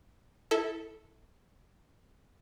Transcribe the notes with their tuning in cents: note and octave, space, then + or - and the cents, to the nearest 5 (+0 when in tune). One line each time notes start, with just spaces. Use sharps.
E4 +0 A4 +0 E5 -35